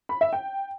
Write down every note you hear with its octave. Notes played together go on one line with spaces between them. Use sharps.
B5
E5
G5